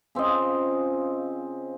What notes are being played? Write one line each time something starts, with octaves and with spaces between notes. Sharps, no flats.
C#3 C4 F4 D#5